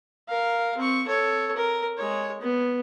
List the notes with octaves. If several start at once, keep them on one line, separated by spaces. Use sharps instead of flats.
A#4 F5
C4 C#6
A4 C#5
A#4
G#3 C#5
B3